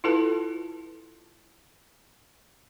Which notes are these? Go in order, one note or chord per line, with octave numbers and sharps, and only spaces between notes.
E4 F4 A4 B4 A5